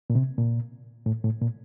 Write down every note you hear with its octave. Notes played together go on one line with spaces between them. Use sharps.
A#2
C3
A#2
A2
A2
A#2